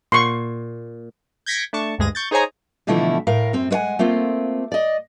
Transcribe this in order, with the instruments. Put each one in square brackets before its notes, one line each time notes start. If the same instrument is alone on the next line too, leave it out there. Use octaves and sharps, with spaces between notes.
[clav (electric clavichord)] A#2 [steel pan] C6 C#6
[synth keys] G6 G#6 A#6 B6 C#7 D7
A3 D4 A5 C#6
D2 G2 G#3 G#4 A#6 D#7
C#6 G6 A6
D#4 G#4 C5 C#5 G#5 A#5
[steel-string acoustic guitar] B2 D3 E3 F3 A3 E4
A2 A#4 F5
F#2 C4
G#3 B4 C#5 F#5 G#5
A3 A#3 C4 F4
D5 D#5